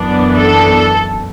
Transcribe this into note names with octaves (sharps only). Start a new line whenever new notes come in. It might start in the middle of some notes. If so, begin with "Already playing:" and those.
Already playing: F#2 E3 B3 D4
A4